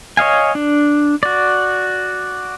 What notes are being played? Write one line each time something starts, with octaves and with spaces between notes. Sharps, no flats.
C#5 D#5 F5 G#5
D4
F#4 D5